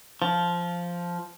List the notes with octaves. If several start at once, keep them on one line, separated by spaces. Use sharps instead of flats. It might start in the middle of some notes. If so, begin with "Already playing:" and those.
F3